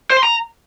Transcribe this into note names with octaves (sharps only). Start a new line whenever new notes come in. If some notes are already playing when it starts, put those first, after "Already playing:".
C5
C6
A#5